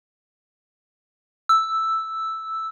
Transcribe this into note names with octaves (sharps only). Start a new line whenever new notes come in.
E6